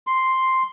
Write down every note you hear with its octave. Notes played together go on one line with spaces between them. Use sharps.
C6